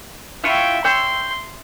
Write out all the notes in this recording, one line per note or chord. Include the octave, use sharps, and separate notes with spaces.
E4 F4 E5 G5 C#6
C#5 G5 C6 E6